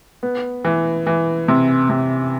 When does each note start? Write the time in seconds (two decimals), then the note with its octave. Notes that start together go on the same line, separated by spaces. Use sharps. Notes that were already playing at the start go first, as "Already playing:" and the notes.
0.23 B3
0.65 E3
1.07 E3
1.48 C3
1.90 C3